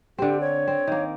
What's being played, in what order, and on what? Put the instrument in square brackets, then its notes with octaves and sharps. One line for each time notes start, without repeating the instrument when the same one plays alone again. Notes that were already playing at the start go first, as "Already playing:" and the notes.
[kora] D3 C4 [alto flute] G4
[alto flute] C#5
[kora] C4
D#3 A#3